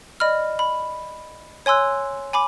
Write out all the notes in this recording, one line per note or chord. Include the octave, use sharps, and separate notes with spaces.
D5 D#5 B5 F6
B5
C#5 G#5 C6 E6 F#6
G#5 B5 D6